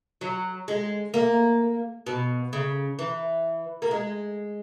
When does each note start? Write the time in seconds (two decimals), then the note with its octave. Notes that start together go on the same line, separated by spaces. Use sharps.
0.21 F#3
0.68 G#3
1.14 A#3
2.06 B2
2.53 C#3
2.99 E3
3.82 A#3
3.91 G#3